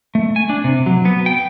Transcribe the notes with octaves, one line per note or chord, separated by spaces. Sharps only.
A3
G#5
D4
C3
F#3
B3
G5